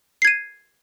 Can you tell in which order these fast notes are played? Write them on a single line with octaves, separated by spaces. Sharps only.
C7 G#6 D#7